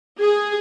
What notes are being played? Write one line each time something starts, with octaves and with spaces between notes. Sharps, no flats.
G#4